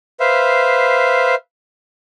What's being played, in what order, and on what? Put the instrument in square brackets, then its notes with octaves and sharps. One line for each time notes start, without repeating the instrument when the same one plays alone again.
[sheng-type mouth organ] B4 C5 E5 F5